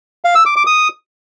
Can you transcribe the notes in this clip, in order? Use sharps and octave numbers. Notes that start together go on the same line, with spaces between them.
F5
E6
D6
D6
D#6